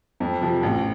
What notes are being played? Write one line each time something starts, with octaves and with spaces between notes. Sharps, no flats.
F2
C3 F3
A1